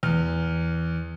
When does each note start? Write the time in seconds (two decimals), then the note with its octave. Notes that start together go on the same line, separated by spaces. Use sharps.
0.03 E2 F6